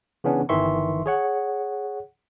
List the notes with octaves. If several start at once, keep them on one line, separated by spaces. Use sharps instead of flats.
C#3 E3 B3 C#4 D4
G1 D#3 E3 E5 C6 C#6
G#4 C#5 F#5